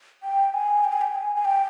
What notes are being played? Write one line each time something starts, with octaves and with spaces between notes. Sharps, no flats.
G5
G#5
G5
G#5
G5
G#5
G#5
G5